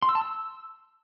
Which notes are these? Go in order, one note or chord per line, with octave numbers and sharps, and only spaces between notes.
C6
E6
A5
E6